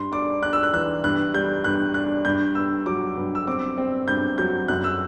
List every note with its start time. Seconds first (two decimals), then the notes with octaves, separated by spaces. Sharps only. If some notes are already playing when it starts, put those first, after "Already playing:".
Already playing: G2 C6
0.12 D4 D6
0.43 D4 F#6
0.53 E6
0.63 F#6
0.73 E3 F#6
1.04 G2 F#6
1.34 G3 G6
1.64 G2 F#6
1.94 D4 F#6
2.25 G2 G6
2.55 G2 E6
2.86 F#3 D6
3.17 G2
3.35 E6
3.47 C4 D6
3.78 C4
4.08 G2 G6
4.38 F#3 G6
4.68 F#2 F#6
4.84 E6